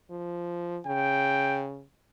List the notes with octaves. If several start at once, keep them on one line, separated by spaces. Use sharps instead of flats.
F3
C#3 G5